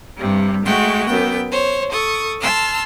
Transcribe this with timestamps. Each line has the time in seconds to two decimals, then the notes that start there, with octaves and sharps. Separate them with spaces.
0.16 G2 C3 G3
0.65 G#3 A3 F#4 G5
1.07 F#2 B3 G5
1.51 C5 C#5
1.91 A4 C#6 D#6
2.40 A5 C6 E6 F6